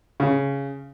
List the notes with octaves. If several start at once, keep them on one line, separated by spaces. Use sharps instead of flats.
C#3